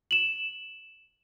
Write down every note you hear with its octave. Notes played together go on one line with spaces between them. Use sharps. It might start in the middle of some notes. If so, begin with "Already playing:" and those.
E7 F#7